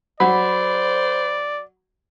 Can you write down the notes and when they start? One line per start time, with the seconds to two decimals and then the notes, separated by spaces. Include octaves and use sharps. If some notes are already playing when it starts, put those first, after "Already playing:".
0.20 F#3 C5 D5 B5